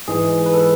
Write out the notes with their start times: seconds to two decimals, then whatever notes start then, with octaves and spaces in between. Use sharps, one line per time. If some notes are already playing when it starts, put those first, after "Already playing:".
0.08 G#2 E3 G#3 G#4
0.46 B4
0.54 A4